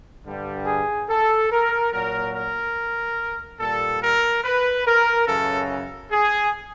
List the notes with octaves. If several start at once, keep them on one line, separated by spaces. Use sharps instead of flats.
G2 D3 G3
G#4
A4
A#4
A#2 F#3 A#4
A#4
A#2 G3 A4
A#4
B4
A#4
F#2 C#3 E3 A4
G#4